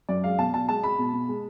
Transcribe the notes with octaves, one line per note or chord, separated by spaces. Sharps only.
F#2 D5
G#3 F5
B2 A5
B2 A5
G#3 A5
G#3 B5
B2
B2
G#3